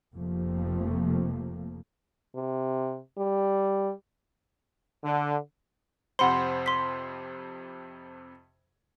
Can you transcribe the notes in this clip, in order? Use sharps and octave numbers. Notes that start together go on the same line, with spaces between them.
F1 F2 C3 F3 A3 A#3
C3
G3
D3
F2 C3 C5 F#5 B5 C6
C6 B6